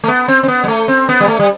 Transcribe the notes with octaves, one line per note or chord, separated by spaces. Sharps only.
A3
B3
C4
C4
B3
G3
A3
C4
B3
G3
A3
G3